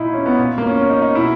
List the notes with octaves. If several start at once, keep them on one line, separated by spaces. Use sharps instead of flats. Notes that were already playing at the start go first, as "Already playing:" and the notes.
Already playing: A#2 D#4 E4
C#4
B3
A#2
A#3
C#4
C#4
D#4
D#4
B2 E4